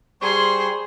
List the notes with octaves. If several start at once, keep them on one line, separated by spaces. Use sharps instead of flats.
G3 G#4 C5 C6 C#6